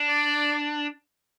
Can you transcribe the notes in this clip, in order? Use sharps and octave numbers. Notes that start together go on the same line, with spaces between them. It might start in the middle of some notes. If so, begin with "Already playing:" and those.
Already playing: D4
D5